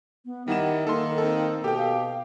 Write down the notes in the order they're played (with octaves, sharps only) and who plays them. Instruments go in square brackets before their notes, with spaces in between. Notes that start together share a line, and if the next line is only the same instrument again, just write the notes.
[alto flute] B3
[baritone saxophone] D#3 [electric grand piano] G3 E4 E7 [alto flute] F#5
[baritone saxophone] D#3 [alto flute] A#3 [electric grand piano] A4 C6
[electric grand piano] C4 A4
[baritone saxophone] B2 [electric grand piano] G4 G5 [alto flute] A4
[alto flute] F5